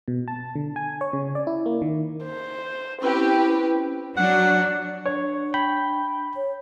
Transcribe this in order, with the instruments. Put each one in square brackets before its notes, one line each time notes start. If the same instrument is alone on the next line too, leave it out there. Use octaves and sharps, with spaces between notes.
[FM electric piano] B2
A5
D3
G#5
C#5
C#3
D5
E4
A#3
D#3
[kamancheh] C5
[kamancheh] C4 [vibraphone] C#4 E4 [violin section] G4 B4
[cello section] F#3 D4 [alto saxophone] F#5
[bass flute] D4 [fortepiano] C#5
[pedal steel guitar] G5 [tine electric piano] B5
[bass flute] C#5